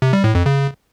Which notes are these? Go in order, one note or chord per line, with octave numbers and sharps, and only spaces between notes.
C3
G3
A2
F2
C#3